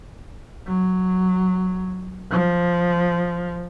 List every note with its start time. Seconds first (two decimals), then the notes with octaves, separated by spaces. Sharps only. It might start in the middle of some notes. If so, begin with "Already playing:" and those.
0.67 F#3
2.31 F3